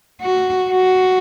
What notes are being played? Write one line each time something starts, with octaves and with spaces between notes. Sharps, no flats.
F#4
F#4